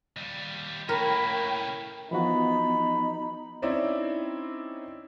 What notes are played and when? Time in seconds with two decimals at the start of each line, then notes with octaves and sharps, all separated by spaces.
0.16 D#2 G3
0.89 A2 A#3 C#4 A#4 C#5 G5 B5
2.11 E3 F3 B3 D#4 F#4 B5
3.62 C4 C#4 D#4 E4 D5